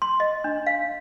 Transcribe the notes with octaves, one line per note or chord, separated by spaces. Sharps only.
C6
D#5
D4
F5